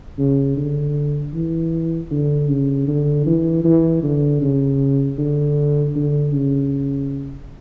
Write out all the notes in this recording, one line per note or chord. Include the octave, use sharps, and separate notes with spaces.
C#3
D3
E3
D3
C#3
D3
E3
E3
D3
C#3
D3
D3
C#3